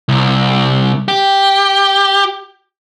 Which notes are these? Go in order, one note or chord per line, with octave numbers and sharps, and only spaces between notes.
C2
G4